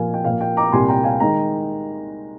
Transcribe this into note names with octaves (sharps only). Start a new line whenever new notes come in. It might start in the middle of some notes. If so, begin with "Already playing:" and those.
Already playing: A#2 F3 A#3 F5 G#5
G5
A#2 F3 A#3 F5
G5
A#5 D6
C2 A#2 G3 A#3 G#5 C6
G5 A#5
F5 G#5
D#3 G#3 G5 A#5